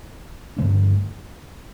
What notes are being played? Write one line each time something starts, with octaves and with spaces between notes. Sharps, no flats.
G2 D3 A3 D4